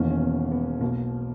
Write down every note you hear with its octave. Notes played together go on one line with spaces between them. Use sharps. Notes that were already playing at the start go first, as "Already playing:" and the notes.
Already playing: E1 E2 D#3 A#3 C#4
C#4
B3
B3
B1 B2 A#3